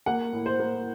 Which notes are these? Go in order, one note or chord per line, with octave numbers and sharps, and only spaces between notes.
A#3 F#5
A2
C5
A#3